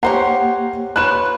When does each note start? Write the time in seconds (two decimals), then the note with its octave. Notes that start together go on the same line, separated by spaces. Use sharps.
0.03 A#3 G4 A#4 C5 C#5 F#5 C7
0.96 F4 B4 C#5 F#6 E7